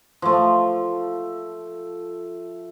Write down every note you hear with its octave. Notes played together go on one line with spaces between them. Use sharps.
F3 A3